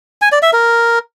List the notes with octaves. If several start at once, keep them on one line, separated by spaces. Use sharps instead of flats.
G#5
D5
E5
A#4